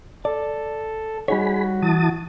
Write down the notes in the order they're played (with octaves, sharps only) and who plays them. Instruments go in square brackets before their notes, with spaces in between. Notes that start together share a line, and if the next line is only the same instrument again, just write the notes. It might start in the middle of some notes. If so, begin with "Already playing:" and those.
[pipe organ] A4 [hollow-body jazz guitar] D5
[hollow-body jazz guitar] G3 D#4 C#5 [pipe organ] F#4 [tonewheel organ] G#4 B5
[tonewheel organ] E3 A5 D#6